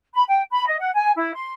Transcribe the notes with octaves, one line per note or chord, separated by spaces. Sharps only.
B5
G5
B5
D#5
F#5
G#5
E4
C6